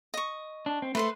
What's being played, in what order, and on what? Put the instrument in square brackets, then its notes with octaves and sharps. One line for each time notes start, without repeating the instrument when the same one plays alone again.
[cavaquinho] D#5 C#6
[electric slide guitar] D4
C4
[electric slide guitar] A3 [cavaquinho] B4 C5 C6